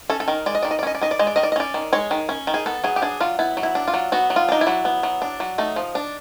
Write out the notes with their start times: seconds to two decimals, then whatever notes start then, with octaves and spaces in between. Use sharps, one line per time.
0.10 C#4 A4
0.20 A4
0.28 D#3 A#4
0.46 G#3 D5
0.55 D#5
0.63 D#3 D5
0.71 D#5
0.79 D5
0.83 C#4 D#5
0.95 D5
1.01 D#3 D#5
1.11 D5
1.19 G#3 D#5
1.27 D5
1.36 D#3 D#5
1.43 D5
1.52 D#5
1.56 C#4 D5
1.74 D#3
1.93 G#3 C#5
2.11 D#3
2.29 C#4
2.47 D#3
2.54 G#4
2.66 B3 A4
2.84 F#3 G#4
2.96 G4
3.02 D4 G#4
3.20 F#3 F4
3.39 B3 E4
3.57 F#3
3.63 E4
3.75 D4
3.88 F4
3.94 F#3
4.12 B3 F#4
4.30 F#3
4.36 F4
4.49 D4 D#4
4.61 E4
4.67 F#3
4.85 B3
5.03 F#3
5.22 D4
5.40 F#3
5.58 A3 D#4
5.76 F3
5.95 D4